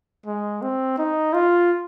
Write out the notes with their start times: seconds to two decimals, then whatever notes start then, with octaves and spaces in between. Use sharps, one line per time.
0.26 G#3
0.62 C4
0.98 D#4
1.34 F4